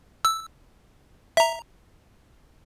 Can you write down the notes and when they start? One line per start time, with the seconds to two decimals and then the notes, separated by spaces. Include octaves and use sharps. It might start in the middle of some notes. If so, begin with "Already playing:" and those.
0.25 E6
1.37 E5 A#5